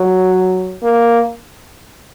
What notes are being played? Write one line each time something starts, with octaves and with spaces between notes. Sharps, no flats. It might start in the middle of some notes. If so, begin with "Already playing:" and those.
Already playing: F#3
A#3